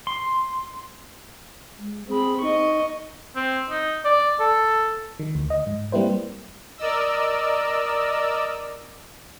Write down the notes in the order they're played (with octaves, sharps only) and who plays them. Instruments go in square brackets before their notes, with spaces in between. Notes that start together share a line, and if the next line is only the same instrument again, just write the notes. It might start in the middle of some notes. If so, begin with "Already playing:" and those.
[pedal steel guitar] C6
[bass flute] G#3
[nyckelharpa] C4 B5 [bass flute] G#4
[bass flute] D#4 [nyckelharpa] D#5 C#6
[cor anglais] C4
D#4
D5
A4
[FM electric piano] D#3
D2
D#5
G#2
G3 A#3 C4 E4 B4 C5
[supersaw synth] A#4 D5 D#5 E6